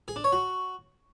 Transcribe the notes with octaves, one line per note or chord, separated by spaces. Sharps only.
G#4
D4
C#5
F#4